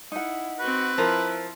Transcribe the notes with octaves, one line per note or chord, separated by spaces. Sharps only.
D#4 E4 F#5
C4 F#4 B4
F3 E4 A#4